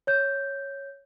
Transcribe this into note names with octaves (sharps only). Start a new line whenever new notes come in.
C#5 G6